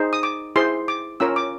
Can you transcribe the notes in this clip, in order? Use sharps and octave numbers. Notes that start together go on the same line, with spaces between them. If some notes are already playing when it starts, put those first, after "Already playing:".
Already playing: D#4 G#4 C5
D#6
D6
E4 G#4 C5 C6
D6
C#4 F4 A#4 C#5 E6
D6